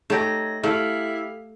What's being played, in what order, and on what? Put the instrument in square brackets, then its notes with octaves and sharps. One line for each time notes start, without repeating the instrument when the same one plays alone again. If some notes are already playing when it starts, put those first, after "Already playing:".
[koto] A3 G4 [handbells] D#4 C#5 A#6
[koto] A3 [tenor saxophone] E4 [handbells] G4 F5 F6